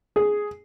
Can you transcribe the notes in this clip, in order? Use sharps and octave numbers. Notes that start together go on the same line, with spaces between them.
G#4